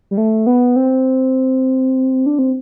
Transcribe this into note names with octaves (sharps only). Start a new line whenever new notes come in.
G3
A3
B3
C4
D4
C4